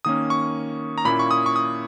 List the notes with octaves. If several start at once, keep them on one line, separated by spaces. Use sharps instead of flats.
D#3 A#3 C#4 D#6
C#6
A#5
A#2 A#3 C#4 E4 B5
C#6
D#6
C#6
D#6